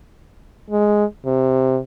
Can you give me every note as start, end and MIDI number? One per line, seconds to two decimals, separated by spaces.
0.70 1.05 56
1.26 1.79 48